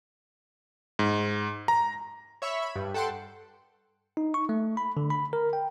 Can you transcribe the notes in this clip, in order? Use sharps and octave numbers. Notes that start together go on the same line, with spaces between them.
G#2
A#5
C#5 E5 B5 C#6
B5
G2
A4 F#5 G5 A5 C6
D#4
C#6
A3
B5
D3
B5
A#4
G5